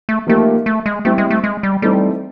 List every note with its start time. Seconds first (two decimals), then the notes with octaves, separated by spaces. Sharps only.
0.09 A3
0.27 F3 A3 A#3 D#4 G4 A#4
0.66 A3
0.86 G#3
1.05 G3 A3 C4 E4 G4
1.18 G#3
1.30 A3
1.44 G#3
1.63 G3
1.82 E3 G3 A3 C4 D#4